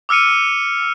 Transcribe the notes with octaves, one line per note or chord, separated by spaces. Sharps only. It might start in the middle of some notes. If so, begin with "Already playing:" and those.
D6 E6 F6 C#7 D#7